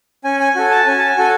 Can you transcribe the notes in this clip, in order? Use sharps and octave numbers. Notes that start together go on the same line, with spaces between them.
C#4 G#5
G#5
F#4 A4 G#5
A5
C#4 G#5
A5
G#5
F#4 A4